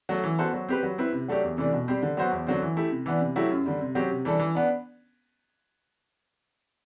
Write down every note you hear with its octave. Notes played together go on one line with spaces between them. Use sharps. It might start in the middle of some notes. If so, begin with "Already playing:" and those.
F#3 A3
E3
B3 F#4 A4 C5
F#3
C4 G4 B4
F#3
C4 E4 B4
C3
F#3 A3 D4 G4
E2
C3 E3 A3 D4
B2
G3 C4 G4 C5
D3
F#3 B3 F#4 C5
E2
D3 F#3 C4
E3
A3 E4 G4
C3
E3 B3 D4
C3
F#3 A3 E4 G4
F#2
D3 G3
C3
F#3 C4 G4
C3
E3 G3 D4 A4
E3
B3 D4